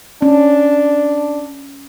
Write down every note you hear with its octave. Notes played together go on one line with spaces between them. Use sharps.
C#4 D4